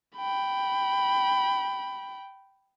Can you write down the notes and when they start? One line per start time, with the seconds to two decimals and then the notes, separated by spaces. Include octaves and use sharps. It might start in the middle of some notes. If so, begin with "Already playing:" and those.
0.17 G5 B5